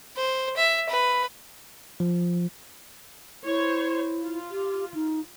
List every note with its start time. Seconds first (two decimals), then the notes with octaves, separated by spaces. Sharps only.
0.16 C5
0.56 E5
0.89 B4
2.00 F3
3.45 E4 C5 C#5
4.21 F4
4.50 G4
4.94 D#4